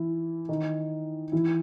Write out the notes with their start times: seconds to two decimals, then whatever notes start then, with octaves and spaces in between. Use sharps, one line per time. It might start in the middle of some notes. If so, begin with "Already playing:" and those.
Already playing: E3 E4
0.48 D#3 D#4
1.32 E3 E4